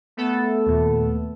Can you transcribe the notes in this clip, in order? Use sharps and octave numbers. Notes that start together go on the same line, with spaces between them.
A3 B3 A4
D#2 A#2